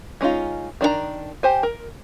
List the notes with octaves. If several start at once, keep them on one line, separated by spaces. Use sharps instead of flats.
G#3 C#4 D#4 F4
D#3 D4 F4 A#5
G4 C5 G#5
A#4